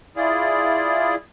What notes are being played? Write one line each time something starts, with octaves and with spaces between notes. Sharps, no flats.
E4 F4 G#4 D5